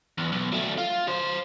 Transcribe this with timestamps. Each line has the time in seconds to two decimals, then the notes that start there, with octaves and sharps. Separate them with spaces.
0.18 E2
0.32 B1
0.52 F#3 A3
0.78 F4
1.07 F#3 C5